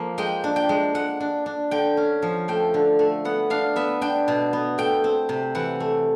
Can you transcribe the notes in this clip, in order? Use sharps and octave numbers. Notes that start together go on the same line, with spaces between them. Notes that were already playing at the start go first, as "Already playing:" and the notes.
Already playing: F3 A#3
G#3 G5
D4
G5
G#3
G#3 F#5
D4
D4
D3 G5
C#4
F3
A3 G5
D3
A3
B3 F#5
D4 F5
B3 E5
D4 G5
B2
B3
A3 G5
C4
C3
E3 F#5
A3